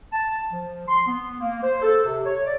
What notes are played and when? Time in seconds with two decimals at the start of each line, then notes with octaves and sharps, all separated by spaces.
0.12 A5
0.51 F3
0.88 C6
1.07 B3
1.40 A#3
1.62 C5
1.81 A4
2.04 C3
2.25 C#5
2.45 D5